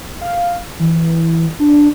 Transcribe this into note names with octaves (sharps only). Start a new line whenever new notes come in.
F5
E3
D4